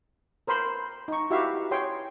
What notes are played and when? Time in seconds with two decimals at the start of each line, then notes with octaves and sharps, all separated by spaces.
0.47 A#4 C5 B5 C6
1.08 D#4 C#6
1.31 E4 F#4 G4 E5 F5
1.71 G#4 C#5 G5 C6